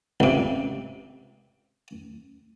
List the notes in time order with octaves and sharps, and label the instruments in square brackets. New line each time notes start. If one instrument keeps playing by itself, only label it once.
[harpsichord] C#2 C3